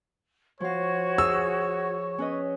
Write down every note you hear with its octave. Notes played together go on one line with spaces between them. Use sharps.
F3 F#4 C#5 F5 G#6
G#4 E6
C#4 B4 D#5